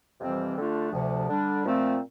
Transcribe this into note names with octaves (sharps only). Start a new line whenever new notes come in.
F2 C3 E3 G3 C4
D3 A3 D4 F4
D2 C3 F3
D3 G3 D4
A#2 F3 A3 C4 F4